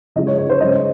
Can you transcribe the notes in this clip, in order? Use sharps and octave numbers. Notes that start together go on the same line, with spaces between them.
C#3 F3 G#3 D#5
C#5
C#5
C5
C#3 G#3 D#5